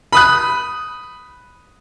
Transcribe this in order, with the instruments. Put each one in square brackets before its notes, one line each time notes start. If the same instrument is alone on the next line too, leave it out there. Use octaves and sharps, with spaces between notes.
[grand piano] B5 D#6 F#6